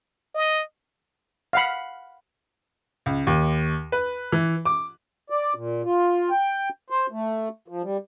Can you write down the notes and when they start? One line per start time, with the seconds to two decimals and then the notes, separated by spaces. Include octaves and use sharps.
0.35 D#5
1.53 F5 F#5 B5
3.06 C#2
3.27 D#2
3.92 B4
4.32 E3
4.66 D6
5.30 D5
5.54 A#2
5.84 F4
6.31 G5
6.90 C5
7.12 A3
7.68 F3
7.83 G3